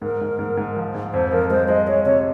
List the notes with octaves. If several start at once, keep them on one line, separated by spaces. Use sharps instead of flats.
G#2 A#4
G#2
G#2
G#2
F3
G#2
F2 C5
F3 A#4
G#3 C5
G#3 D#5
G#3 C#5
C3 C#5